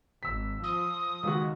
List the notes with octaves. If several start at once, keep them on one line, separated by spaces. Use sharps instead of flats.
G#1 E6 B6
F3 D#6
C#2 D#3 G#3 F#4